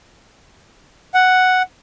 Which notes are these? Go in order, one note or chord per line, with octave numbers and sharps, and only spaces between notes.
F#5